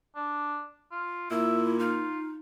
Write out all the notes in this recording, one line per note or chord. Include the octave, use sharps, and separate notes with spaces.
D4
F4
A#2 E4 E5
D#4 F4